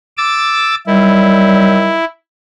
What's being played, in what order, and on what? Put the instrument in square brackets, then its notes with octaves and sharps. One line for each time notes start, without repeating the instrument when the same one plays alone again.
[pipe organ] D6 E6 A6
[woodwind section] D#3 F#3 G3 [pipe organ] E4